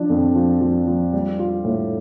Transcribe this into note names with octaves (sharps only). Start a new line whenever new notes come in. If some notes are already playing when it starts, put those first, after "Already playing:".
Already playing: F3 D4
F2
F3
F3
F3
G3
F4
A2